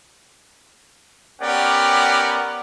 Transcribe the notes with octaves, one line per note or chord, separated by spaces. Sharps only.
B3 C#4 G4 A#4 D5 F#5